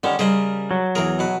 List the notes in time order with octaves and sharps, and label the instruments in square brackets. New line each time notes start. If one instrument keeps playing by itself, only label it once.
[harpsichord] D3 D#3 G3 [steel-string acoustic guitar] C#4
[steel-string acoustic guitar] C#3 G3 A#4 [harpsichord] G#4 C5 D#5
[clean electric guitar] F#3
[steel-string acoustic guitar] E2 E3 [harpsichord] G#4 A#4
[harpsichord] B2 B4